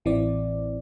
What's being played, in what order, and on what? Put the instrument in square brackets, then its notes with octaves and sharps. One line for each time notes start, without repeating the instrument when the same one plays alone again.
[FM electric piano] A1 E3 C4 D5